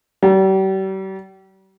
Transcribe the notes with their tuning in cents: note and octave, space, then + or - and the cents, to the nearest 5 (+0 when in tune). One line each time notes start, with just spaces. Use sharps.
G3 -40